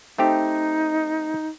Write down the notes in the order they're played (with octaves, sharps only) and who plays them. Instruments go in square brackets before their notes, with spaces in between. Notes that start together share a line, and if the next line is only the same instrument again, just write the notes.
[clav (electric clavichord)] A3 C4 G4 [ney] D#4